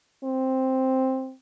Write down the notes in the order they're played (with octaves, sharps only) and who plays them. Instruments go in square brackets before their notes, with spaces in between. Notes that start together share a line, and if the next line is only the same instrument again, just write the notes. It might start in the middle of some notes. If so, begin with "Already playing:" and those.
[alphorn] C4